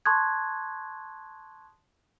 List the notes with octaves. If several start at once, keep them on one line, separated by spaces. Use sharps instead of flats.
A5 C6 C#6 D#6 F#6 G#6